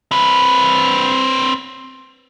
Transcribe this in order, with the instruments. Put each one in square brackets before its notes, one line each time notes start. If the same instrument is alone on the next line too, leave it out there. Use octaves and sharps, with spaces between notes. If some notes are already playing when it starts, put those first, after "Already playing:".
[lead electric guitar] C4 B4